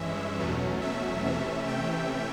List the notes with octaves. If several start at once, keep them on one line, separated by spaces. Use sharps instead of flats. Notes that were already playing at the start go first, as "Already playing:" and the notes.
Already playing: G2 E3 G#3 C#4 E5
E2 B2 F#3 A3 C#4
E5
C3 E3 A3 C#4
G5